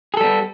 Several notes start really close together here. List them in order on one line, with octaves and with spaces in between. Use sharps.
G#4 A4 G3 B3